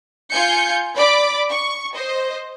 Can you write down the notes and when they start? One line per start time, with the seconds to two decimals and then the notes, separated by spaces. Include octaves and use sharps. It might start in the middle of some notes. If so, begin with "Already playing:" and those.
0.31 F4 G#5 G6 C#7
0.97 D5 B5 D6
1.51 C#6
1.95 C5 D#5